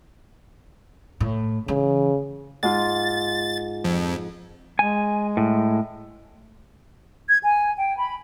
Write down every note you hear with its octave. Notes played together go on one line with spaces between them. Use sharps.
A2
C#3 E3
G#2 F4 A6
F2
G#3 G#5
A2
G#6
G#5
G5
B5